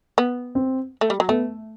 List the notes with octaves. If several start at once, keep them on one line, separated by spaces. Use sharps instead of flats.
B3
C4
A3
G3
F#3
A3 B3